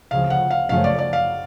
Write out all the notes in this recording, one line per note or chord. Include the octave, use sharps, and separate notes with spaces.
D2 C#3 F3 F5
F#5
F5
F#2 C#3 F3 A3 C#4 F5
D5
D5
F5